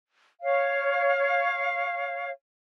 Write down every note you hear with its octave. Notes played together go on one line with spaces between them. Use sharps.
C#5 F5